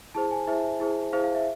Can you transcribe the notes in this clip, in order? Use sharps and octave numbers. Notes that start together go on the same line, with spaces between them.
E4 G#4 C5 A5
G#5
E4 G#4 C5 E5
E4 G#4 C5
E4 G#4 C5 F5
F5
E5